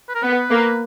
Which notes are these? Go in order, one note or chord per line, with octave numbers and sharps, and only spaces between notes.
B4
A#4
B3 B4
A#3